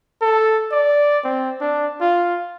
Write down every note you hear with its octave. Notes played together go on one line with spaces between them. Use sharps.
A4
D5
C4
D4
F4